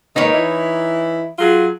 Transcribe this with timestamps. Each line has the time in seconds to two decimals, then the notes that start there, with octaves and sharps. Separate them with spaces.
0.16 G#2 D#3 A#3 D#4 B4 C#5
0.33 E3 E4
1.39 F#3 F4 G#4